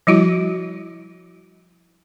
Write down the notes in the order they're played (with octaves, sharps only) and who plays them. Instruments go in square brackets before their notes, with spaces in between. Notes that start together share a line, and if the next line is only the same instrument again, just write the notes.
[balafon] F3 G3 E4 F#4